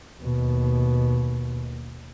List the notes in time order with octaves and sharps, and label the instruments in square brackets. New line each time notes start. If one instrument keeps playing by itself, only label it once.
[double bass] D#2 B2